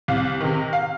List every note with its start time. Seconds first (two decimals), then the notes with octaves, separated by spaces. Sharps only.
0.08 C2 F5
0.40 C3 D#3
0.73 F5